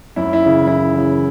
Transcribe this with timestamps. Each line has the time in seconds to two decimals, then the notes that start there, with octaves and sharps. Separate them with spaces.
0.16 F#2 E4
0.33 E4
0.42 C#3 E3
0.67 F#2 E4
0.92 C#3 E3